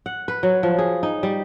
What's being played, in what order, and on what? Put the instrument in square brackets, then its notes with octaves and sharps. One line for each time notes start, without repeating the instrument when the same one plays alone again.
[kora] F#5
B4
F#3
F3
G#4
D#4
G3